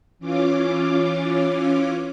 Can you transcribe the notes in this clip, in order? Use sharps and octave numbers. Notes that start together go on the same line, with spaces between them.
E3 C#4 F4 D6